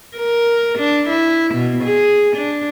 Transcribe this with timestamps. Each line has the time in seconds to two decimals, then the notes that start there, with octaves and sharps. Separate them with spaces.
0.15 A#4
0.78 D4
1.09 E4
1.54 B2
1.84 G#4
2.36 D4